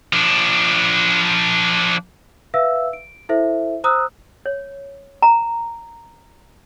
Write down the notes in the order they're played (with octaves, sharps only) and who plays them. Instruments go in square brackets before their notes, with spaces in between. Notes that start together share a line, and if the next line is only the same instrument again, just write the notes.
[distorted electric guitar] F3 D4
[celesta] B4 E5 F5 E6
D7
E4 A4 C5 E5
C5 A#5 D#6 E6 F#6
[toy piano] C#5
A#5